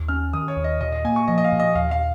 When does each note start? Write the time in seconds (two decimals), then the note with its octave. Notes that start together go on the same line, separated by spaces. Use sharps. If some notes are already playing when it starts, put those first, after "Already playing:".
Already playing: D#2
0.08 C#4 F6
0.33 D#3 D#6
0.48 C#5
0.57 D#2
0.64 D#5
0.81 A#2 D#5
0.92 D#5
1.04 A#3 G#5
1.16 C#6
1.28 F3 D#5
1.38 D#5
1.45 F5
1.52 A#2
1.60 D#5
1.75 D#2 F5
1.91 F5